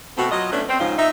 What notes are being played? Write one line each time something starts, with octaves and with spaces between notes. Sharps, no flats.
B2 A3 C4 F#4
F#3 F4 D#5
A3 B3 C#4 D4
C4
G#2 C#3 F3 F4
D#4 E5